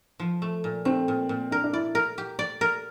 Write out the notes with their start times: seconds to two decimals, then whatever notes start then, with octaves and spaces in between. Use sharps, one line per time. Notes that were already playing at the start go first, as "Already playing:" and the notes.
0.20 F3
0.42 A3
0.64 A#2
0.85 A3 C4
1.08 A#2
1.29 A#2
1.51 D4 A#4
1.64 D4
1.73 E4 D5
1.95 A#4
2.18 G4
2.39 D5
2.61 A#4